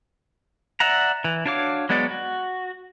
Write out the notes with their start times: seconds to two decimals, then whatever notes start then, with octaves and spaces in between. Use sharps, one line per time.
0.80 D5 E5 F#5 A#5
1.24 E3
1.46 D4 F#4 C#5 F5 D6
1.89 F#3 G#3 B3 F#4 D5
2.11 F#4